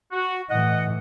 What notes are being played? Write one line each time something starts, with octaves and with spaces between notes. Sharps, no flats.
F#4
A2 E3 D#5 F#5